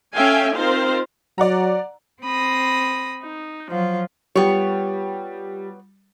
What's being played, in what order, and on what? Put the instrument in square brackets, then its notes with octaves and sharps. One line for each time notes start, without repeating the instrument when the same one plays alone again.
[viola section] C#4 A4 E5 F5 G5 G#5
C4 D#4 F4 A#4 C5 F5
[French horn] F#3 [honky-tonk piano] D5 F#5 A#5
[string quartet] C4 B5 D#6 A#6
D#4
F3 F#3 F4
[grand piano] G3 [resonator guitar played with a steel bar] B3 C#5 [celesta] F4 G4 G5